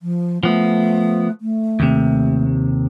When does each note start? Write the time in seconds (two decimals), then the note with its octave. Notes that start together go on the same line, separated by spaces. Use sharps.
0.02 F3
0.43 F3 A3 B3
1.41 A3
1.80 D#2 C3